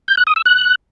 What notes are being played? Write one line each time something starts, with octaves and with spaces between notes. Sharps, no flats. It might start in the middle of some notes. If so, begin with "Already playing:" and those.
G6
F#6
D#6
E6
F#6